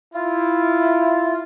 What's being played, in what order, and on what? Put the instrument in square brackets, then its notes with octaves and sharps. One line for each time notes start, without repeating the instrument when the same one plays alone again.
[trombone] E4 [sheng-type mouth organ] F4